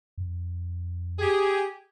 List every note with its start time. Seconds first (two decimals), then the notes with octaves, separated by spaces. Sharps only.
0.18 F2
1.19 G4 G#4